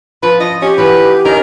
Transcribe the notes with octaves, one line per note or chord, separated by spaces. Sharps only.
F3 B4
F3 D#5
C#4 G4
E3 B3 B4
D#3 C#4 D#4 A#4